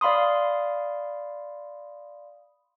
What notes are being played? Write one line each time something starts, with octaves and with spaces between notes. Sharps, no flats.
D5 F5 B5 C6 D#6